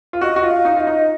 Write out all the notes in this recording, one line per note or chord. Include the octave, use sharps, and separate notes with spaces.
F4
F#4 D#5
F#4
F4
F5
D#4
F4 D#5
D#4